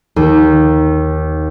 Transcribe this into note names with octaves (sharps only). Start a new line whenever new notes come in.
D#2